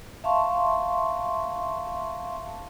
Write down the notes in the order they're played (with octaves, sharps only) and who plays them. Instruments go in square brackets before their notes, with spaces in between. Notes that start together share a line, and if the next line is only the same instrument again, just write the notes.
[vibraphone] E5 F5 A5 C6 C#6